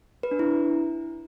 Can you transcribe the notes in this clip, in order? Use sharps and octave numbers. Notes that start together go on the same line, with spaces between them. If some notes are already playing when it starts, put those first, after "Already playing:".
B4
D4
E4